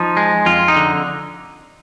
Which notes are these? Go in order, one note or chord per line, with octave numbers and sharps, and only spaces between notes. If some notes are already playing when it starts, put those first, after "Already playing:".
Already playing: F3 D#4
G#3
F2 F4
D#4
D3